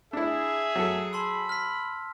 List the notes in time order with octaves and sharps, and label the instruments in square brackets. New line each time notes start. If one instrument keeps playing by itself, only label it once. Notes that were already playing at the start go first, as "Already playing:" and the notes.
[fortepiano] D4 E4 [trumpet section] G#4 [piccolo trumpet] E5
[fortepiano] F#3 A4
[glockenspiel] A5 C6 E6 [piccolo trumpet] B5
[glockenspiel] F6 B6